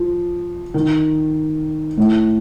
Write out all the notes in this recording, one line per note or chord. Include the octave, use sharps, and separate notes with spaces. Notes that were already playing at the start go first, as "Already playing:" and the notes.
Already playing: F3
D#3
A2